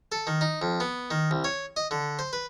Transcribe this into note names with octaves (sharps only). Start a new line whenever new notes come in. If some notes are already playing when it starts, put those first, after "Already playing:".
A4
D#3
D#4
F2
B3
D#3
C2
C#5
D#5
D3
C5
B4